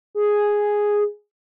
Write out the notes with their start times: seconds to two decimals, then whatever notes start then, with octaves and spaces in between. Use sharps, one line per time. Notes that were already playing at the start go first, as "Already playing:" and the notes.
0.15 G#4